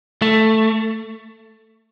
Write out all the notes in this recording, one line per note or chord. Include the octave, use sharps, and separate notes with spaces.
A3